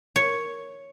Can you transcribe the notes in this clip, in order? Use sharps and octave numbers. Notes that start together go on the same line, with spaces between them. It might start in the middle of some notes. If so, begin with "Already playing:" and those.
C#5